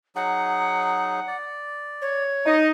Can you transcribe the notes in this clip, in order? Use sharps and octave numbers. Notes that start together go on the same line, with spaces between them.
F#3 D#4 G#4 F#5
D5
C#5
D#4 D#5